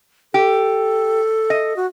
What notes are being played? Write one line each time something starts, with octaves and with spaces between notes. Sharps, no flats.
G4 A4
D#5
F#4